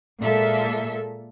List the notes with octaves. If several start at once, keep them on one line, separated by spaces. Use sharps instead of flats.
A#2 G#3 A#3 A4 E5